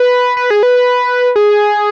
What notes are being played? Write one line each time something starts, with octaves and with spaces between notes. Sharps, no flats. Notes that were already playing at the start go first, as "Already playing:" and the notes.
Already playing: B4
B4
G#4
B4
G#4